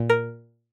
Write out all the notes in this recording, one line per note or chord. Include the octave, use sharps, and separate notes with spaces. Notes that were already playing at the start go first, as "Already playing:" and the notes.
Already playing: A#2
A#4